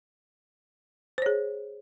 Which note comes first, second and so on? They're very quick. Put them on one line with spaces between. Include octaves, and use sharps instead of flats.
C5 C#5 G#4